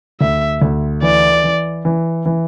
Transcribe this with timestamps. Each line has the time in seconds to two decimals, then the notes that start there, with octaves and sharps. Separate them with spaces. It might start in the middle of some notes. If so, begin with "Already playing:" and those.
0.21 D2 E5
0.62 D2
1.02 E3 D5
1.44 E3
1.85 E3
2.26 E3